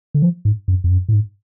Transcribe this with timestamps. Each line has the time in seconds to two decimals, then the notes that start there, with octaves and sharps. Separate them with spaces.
0.14 D3
0.22 F3
0.45 G#2
0.68 F#2
0.84 F2
0.91 F#2
1.09 A2
1.13 G#2